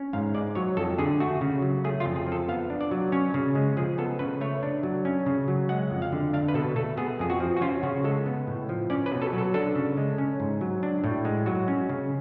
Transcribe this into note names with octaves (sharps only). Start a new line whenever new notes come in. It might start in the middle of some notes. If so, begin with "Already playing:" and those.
Already playing: C#4
G#2 F5
G#3 D5
F#3 C#5
F2 A4
D3 G#4
A3 F#4
C#3
F#3
A3 G#4
F4
F2
G#4
F3
A4
B3 F5
D4
D5
F#3
C#4 C#5
C#3
G#3
F3 G#4
B3 A4
C#3 B4
A3 C#5
D4
F#3
C#4
C#3
F#3
G#3 F#5
F2
F5
D3
D4 F5
B4
B2 A4
A3 A4
B3 G#4
F2 G#4
F#4
F3
F#4
C#4 F4
C#3 F#4
G#3 A4
B3
A2
F3
C#4 D5
B4
B2
A4
F#3
A4
D4 A4
C#3
G#3
C#4
G#2
F#3
D4
A2
G#3
F#3 F#4
C#4
C#3